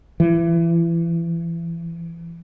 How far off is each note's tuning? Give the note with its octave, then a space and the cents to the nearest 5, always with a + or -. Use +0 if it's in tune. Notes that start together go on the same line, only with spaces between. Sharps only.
E3 +30